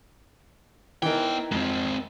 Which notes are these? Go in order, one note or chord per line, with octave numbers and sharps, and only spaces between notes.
E3 B3 D#4 A#4 G5
F2 G#3 C4